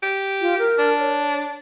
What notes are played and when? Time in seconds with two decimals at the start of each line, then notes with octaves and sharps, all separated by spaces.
0.03 G4
0.41 F4
0.59 A#4
0.78 D4
0.99 C#5